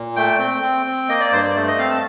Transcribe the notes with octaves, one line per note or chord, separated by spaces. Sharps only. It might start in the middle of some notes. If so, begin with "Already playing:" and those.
Already playing: A#2
A3 G5
C4
C4
C4
A#3 D#5
D5
G2 C5
D5
A3
D#5
C4 F5
A5